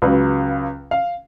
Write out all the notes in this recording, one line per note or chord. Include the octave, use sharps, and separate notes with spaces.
C#2 C#3 F#3 B4
F5